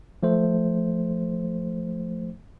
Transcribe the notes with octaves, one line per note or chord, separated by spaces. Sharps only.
F3 A3 C5